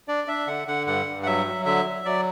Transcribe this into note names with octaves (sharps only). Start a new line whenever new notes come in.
D4 D5
D4 E5
D3 F#5
D3 F#5
G2 F#5
G2
F#5
F#3 E5
F#3
D3 E5
F#3
F#3 D5